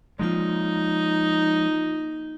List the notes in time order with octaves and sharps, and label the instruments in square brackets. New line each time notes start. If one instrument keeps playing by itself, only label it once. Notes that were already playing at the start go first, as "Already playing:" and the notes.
[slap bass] F3 G#3 [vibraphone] A#3 F4 [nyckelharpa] D#4